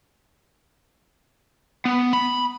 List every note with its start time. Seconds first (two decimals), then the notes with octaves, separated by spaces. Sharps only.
1.85 B3
2.13 B5